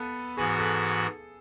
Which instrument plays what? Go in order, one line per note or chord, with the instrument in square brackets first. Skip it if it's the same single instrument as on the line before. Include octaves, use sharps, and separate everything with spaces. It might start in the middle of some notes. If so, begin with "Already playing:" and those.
Already playing: [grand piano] B3 A4 B4
[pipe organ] G#2 E3 B3 F#4 [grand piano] G#4
[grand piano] A4